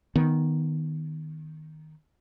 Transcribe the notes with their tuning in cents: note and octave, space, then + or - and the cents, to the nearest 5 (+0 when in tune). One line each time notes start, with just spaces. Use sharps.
D#3 +0 B3 -5